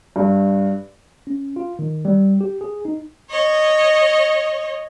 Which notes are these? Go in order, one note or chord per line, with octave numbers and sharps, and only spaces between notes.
G2
C#4
F4
D#3
G3
G4
G#4
D#4
C#5 D#5